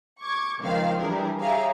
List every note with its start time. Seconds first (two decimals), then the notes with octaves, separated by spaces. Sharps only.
0.20 C#6 D6 G#6
0.60 C#2 D#3 F3 C4 F5
1.00 E3 G3 D4 G#4 A#4
1.40 G4 G#4 C#5 E5 F5 A#5